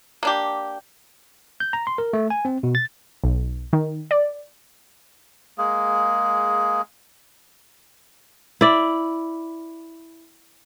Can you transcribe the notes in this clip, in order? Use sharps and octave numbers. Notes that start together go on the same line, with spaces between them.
A#3 D4 G4
G6
A#5
C6
A#4
A3
G#5
C4
B2
A6
B1
D#3
D5
G#3 A#3 G#4
E4 D5